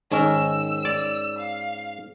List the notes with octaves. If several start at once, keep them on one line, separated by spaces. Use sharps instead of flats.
G#2 D#3 C#4 A#4 E6
D5
F5